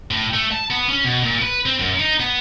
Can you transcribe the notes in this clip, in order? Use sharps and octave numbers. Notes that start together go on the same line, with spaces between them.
A2
A3
A5
B3
C#4
B2
A#2
B4
C4
F#2
D#4
B3